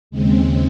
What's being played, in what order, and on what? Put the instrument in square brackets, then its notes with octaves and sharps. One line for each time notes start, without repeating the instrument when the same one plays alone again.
[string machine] D#2 C#3 G#3 C4